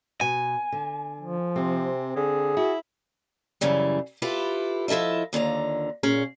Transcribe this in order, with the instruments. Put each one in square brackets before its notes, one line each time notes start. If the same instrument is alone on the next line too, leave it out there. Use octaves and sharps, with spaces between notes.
[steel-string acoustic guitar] B2 [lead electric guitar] G#5
[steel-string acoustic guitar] D3
[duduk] F3
[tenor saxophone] C3 [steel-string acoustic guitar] C4
[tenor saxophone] D3 [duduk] G#4
[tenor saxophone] E4 [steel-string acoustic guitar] F#4
[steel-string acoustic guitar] F#2 C#3 E3 G3
E4 F4 G4 A4 B4
F3 E4 A4 D#5 E5
D#2 D3 F4 A#5
A#2 C#4 G#4